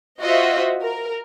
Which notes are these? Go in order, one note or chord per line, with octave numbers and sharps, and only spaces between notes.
F4 F#4 C5 D#5 E5
A#4